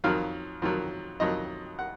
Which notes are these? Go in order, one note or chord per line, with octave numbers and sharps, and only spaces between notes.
F2 D#3 F#3 F5
F2 D#3 F#3
F2 D#3 F#3 D#5
F#5